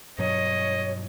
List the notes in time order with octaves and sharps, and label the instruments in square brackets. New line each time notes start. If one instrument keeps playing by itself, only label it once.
[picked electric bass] G2 B2 F#3 [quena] C#5 [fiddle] D#5